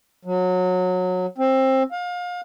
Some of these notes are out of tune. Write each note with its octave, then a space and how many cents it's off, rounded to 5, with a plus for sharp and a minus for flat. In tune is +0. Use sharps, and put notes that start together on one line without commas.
F#3 -20
C4 +20
F5 +30